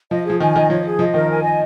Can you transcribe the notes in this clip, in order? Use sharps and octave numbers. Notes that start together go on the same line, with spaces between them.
F3 D#5
F3 G#4
D#3 G#5
D#3 D#5
F3 C#5
G#4
F3 D#5
D#3 A#4
G#5
D#5